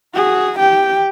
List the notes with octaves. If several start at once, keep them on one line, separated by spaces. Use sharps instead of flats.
F#4 G#4
G4 G5